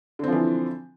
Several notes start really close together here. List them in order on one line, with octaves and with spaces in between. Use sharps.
D3 C4 F3 E3